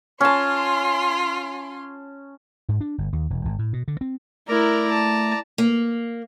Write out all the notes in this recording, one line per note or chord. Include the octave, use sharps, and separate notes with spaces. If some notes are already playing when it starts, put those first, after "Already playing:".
C#4 F4 A5 C6
G#2
D4
G1
D#2
E1
G#1
A2
B2
D3
C4
A3 E4 A#4 D5 A#5
A5
A#3